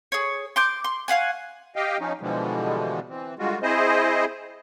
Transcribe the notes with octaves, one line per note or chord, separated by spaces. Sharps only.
G#4 C#5
C6 D6 G6
C6
C#5 F5 F#5 G#5
G4 D#5 F5 G5
F3 C#4 D#4
B2 D3 E3 F3 G3 G#3
E3 C4
D3 G3 G#3 F4 F#4
C4 E4 G#4 C5 D#5